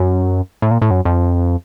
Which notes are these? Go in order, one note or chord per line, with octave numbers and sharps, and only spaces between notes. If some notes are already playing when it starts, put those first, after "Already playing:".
Already playing: F#2
A2
A#2
A2
F#2
F2